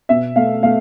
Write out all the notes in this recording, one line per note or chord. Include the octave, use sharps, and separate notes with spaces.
B2 E5
A3 F5
A3 F5